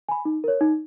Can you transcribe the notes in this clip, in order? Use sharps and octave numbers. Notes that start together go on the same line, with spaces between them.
G#5 B5
D#4
A#4 C#5
D#4